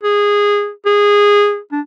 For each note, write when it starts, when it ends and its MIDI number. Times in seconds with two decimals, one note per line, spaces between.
0.03 0.70 68
0.86 1.59 68
1.72 1.80 62